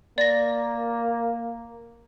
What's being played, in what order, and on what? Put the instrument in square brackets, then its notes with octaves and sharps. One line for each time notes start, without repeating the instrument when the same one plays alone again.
[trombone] A#3 [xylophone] D5 A#6